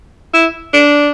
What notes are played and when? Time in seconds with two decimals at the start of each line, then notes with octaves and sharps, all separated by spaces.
0.34 E4
0.74 D4